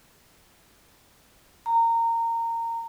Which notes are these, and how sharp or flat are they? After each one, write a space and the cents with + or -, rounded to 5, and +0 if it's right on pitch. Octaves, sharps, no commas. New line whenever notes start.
A#5 -20